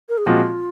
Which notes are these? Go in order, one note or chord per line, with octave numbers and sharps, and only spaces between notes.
A#4
G#4
A#2 F3 G#3 C4 F4 F#4